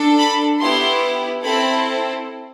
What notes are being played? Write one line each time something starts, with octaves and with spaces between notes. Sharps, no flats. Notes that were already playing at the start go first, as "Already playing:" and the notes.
Already playing: D4 A4
B5
B3 E4 G4 C6
C4 E4 A4 B5